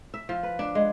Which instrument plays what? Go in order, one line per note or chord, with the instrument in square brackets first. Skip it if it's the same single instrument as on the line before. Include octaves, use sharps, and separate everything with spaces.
[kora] E5
F3
B4
D4
G#3